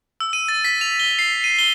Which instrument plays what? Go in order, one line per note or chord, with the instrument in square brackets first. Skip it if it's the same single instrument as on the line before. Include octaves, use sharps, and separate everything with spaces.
[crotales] E6
D#7
A6
B6
F7
G7
C7
D#7
G7